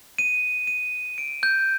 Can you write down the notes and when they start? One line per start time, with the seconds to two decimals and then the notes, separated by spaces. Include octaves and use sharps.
0.18 D#7
0.67 D#7
1.18 D7
1.43 G6